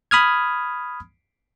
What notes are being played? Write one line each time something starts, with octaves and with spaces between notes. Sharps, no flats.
B5 D#6 F6 G#6